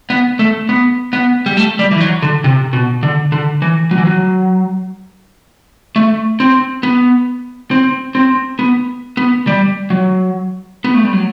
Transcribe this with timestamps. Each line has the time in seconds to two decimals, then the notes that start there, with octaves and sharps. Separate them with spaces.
0.10 B3
0.39 A3
0.69 B3
1.13 B3
1.46 G3
1.57 A3
1.79 G3
1.91 E3
2.00 F#3
2.22 D3
2.44 C3
2.73 B2
3.03 D3
3.32 D3
3.62 E3
3.91 F#3
3.98 E3
4.05 F#3
5.96 A3
6.40 C4
6.83 B3
7.71 C4
8.15 C4
8.59 B3
9.17 B3
9.47 G3
9.90 F#3
10.84 B3
10.94 A3
11.03 G3
11.13 F#3